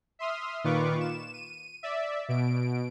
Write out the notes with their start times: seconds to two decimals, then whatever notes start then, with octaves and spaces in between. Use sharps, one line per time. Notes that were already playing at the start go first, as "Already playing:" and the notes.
0.19 E5 C6 D#6 F6
0.64 A#2 D#3 F4 B4 C#6 D6
1.01 E7
1.34 D#7
1.83 D5 E5
2.29 B2 D7